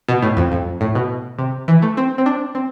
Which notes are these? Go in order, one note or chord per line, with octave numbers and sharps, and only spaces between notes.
B2
A2
F2
F2
A2
B2
C3
E3
A3
C4
C4
D4
C4